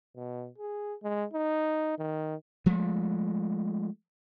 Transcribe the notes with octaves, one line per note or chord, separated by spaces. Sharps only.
B2
G#4
G#3
D#4
D#3
F3 G#3 A3